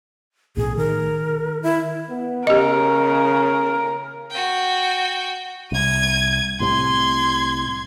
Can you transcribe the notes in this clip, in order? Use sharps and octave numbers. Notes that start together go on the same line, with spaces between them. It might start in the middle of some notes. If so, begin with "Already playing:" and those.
B1 A2 G#4
D#3 A#4
E4
B3
C#3 G4 A#4 D#5
F#4 G5
C2 G#6 D#7
C2 A2 C3 C6 G#6